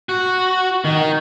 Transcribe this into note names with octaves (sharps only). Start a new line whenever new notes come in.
F#4
D#3